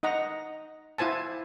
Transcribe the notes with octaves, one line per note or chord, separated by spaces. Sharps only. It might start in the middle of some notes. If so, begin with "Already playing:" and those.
D#4 D#5 F#5 A#5
E4 F4 C5 G#5 A5